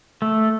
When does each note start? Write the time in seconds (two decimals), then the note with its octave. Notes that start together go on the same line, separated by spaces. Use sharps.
0.22 A3